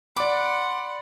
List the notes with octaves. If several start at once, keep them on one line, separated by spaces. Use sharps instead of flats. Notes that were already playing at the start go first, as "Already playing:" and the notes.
D5 F#5 B5 C6 D6